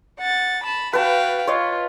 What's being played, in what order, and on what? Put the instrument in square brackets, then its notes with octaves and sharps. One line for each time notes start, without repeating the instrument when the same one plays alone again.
[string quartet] F#5 A6
A5 B5
[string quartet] F#4 F5 G5 [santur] B4 A5
[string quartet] F4 [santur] C#5 D#5